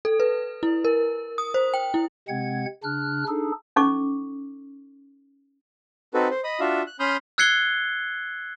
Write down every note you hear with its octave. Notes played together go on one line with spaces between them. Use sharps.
A4
B4
E4
A#4
D#6
C5
G5
E4
C3 G#3 C4 F#5 G#6
C#3 D4 F6 F#6
D4 D#4 G#4 A4
C#4 D#4 A4 C#6 D6
C4 D#4 F#4 A4 B4
C5
D#5 B5 D#6
D4 F4 F#4 E5 F5
F#6
C#4 B5 C6 D#6 F6 G6
E6 F#6 G#6 C7 C#7 G7